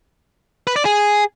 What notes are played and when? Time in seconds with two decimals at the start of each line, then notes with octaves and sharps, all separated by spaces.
0.67 B4
0.76 D5
0.85 G#4